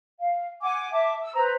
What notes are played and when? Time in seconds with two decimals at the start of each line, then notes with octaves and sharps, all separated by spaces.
0.20 F5
0.61 F#5 G#5 D6
0.91 E5 A5 D6
1.21 E6
1.35 B4 C5 A#5